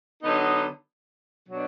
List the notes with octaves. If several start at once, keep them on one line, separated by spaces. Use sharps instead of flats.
D3 F#3 B3 D#4
B2 F#3 D4